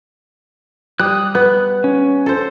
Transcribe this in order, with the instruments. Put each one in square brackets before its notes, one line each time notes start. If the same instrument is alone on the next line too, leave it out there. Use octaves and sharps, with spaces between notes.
[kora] G3 [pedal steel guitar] D#6 F#6
[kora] B3 [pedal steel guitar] F#6
[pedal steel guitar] C#4
[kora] A4 C5